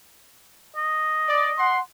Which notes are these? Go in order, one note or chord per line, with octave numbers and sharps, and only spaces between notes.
D#5
D5
F#5 C6